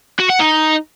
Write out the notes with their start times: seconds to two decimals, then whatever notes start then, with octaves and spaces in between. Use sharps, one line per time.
0.20 F#4
0.30 F#5
0.40 D#4